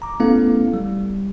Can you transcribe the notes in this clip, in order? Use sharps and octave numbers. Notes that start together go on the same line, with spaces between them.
A#5 D6
A3 B3 C#4 E4 A4 F5
G3